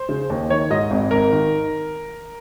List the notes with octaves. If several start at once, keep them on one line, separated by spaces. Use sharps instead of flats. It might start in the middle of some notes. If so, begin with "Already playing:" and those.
Already playing: C5
C#3
D#2
D#3 C#5
G#2 D#5
G#1
G#1 A#4
D#3